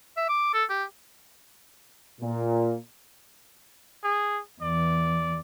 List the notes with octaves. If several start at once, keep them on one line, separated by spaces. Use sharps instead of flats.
E5
D6
A4
G4
A#2
G#4
E2 D5